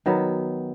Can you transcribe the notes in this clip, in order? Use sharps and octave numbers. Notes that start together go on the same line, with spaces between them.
D#3 F#3 B3